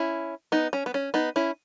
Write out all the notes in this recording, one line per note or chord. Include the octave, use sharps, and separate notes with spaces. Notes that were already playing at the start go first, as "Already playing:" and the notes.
Already playing: C#4 E4
B3 D#4
C#4
B3
C#4
B3 D#4
C#4 E4